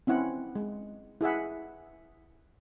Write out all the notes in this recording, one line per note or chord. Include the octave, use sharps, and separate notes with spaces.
C4 C#4 E4 F#5
G#3
E4 G#4 E5 F#5